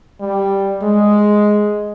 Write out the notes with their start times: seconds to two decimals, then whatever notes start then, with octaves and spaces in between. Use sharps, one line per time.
0.21 G3
0.82 G#3